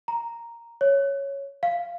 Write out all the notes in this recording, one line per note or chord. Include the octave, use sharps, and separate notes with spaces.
A#5
C#5
F5